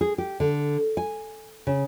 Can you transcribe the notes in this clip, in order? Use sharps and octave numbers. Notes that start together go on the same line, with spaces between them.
G#4
G4
D3
G#5
C#3